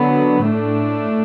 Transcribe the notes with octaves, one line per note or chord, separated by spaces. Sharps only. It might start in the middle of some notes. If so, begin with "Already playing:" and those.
Already playing: D3 F#3 B3
A2 A3 D4